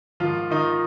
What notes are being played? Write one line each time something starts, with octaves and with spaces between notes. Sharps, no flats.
G#2 D#3 F3 F4
D#3 D#4